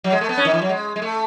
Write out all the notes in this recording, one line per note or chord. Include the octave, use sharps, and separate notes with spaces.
F#3
G#3
A3
B3
C#4
D#3
E3
F#3
G#3
G#3
A3